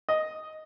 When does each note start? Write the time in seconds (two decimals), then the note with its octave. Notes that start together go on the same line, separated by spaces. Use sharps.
0.09 D#5